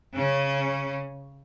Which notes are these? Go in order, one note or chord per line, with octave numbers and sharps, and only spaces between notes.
C#3 C#4